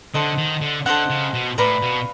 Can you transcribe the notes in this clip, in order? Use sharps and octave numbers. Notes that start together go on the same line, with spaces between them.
D3 A4 C5 D#5 F#5
D#3
D3
D3 A4 C5 D#5 F#5
C#3
B2
A2 B4 D5 F5 A#5
B2